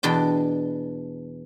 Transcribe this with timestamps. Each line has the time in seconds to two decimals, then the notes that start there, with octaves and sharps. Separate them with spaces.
0.03 E2 B2 D4 G5